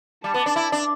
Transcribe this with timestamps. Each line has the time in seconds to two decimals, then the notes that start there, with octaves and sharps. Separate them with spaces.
0.24 G3 A5
0.34 B3
0.46 D4
0.56 E4
0.72 D4